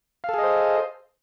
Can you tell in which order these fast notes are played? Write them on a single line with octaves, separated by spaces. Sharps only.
F5 A4 G#4 D#5 C5